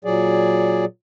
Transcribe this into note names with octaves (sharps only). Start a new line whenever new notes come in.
A#2 F#3 G#4 D5